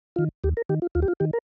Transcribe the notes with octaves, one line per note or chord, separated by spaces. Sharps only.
D#3 F4
D#2 G4
A#4
D#3 G4
F4
D#2 F4
G4
F4
D#3 G4
A#4